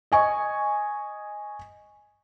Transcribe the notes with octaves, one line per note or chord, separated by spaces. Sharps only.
D#5 G#5 C#6